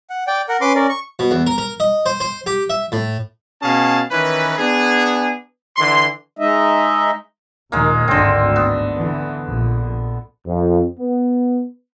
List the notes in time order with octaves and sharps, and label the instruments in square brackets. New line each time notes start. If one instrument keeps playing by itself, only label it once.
[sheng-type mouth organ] F#5
D5 G5
A#4 F#5
C#4 B4 C6 D6
C#4 A#4 D5
C#6
[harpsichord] B2
E2
A#4
A#4
D#5
C5
C5
G4
E5
A2
[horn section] B2 C#4 G#4 F5 A5
D#3 E3 C#4 B4
B3 D4 G#4
D3 E3 C6
[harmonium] G#3 D#4 D#5 E5
[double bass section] D#2 A#2 D#3 [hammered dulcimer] G#3 A#3
[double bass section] G#1 D2 A2 [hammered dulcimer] D3 C4
[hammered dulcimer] B3
[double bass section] D3 E3
A#1
[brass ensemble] F2
B3